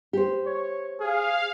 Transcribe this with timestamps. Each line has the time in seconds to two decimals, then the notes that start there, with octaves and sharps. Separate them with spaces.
0.13 G4 C5
0.46 C#5
1.00 G#4 F5